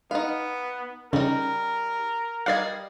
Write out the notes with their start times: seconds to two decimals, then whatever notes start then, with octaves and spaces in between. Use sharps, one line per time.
0.11 B3 D#4 F5
1.13 C#3 G3 D#4 A#4
2.46 G3 D5 D#5 F5 G#6